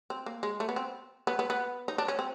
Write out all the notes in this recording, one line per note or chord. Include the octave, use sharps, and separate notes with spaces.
C4
A#3
G#3
A3
B3
C4
B3
B3
B3
D#4
D4
C#4
C4